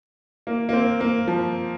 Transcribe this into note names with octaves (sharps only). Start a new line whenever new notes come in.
A#3
A#3
C4
A#3
F3